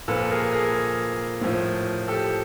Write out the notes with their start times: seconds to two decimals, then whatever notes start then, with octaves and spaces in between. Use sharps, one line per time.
0.08 A#2 F3 A4 B4
0.30 G#4 A#4
0.52 G#4 A#4
1.41 A2 F3
2.08 G4 A4